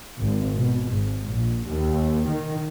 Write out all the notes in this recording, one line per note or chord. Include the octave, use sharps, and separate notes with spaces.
G#1
B2
G#1
A#1
D#2
D#3